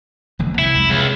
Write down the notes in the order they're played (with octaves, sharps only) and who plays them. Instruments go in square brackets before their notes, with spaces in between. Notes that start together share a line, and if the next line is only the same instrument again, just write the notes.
[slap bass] E1 A#1 D3
[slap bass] C2 [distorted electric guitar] E4
[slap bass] C2 F2 G#3
[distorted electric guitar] C#2 [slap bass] C3